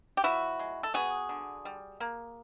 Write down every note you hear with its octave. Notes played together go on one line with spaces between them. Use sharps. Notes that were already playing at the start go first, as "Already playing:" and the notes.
G4
F3 E4 F#4
G#3
A4
B3 F#4 G#4
D3
G3
A#3